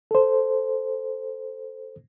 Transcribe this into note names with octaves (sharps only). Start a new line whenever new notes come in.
A4 C5